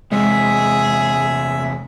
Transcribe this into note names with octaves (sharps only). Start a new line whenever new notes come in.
E2 C3 G#3 G#4 E5